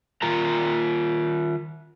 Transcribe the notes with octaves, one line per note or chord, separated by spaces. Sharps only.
D#3 F4 A#4 A#5